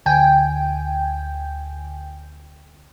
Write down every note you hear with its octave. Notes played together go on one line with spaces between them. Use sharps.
D2 G5 G#5